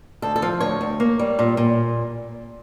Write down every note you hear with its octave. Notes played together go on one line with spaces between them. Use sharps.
D2 A4
A4
F3
D2 C#5
D2
A#3
G3
A#2
A#2